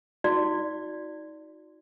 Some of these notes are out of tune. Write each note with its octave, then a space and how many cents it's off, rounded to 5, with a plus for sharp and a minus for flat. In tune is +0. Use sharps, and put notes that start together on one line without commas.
D#4 +30 F#4 -25 D5 +0